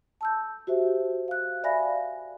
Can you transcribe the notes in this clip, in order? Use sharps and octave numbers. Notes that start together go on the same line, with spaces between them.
A5 E6 G6
F#4 G4 C5 E5
F5 F#6
D5 E5 F5 G#5 B5 A#6